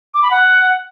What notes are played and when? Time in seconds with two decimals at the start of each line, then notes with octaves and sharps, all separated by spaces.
0.14 D6
0.23 B5
0.31 F#5